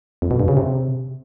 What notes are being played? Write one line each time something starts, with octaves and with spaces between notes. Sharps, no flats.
F2
B2
G2
C#3
C3